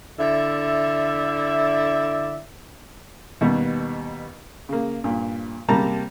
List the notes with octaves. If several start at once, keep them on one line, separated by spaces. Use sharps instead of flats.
D3 E4 D5 E5
D#2 B2 G3 B3
C#3 A#3
G2 A#2
C3 G3 A#3 A5 A#5